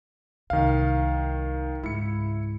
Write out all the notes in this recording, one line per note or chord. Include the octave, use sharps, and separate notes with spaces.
C2 D#3 F5
C#2 G#2 E4 C#7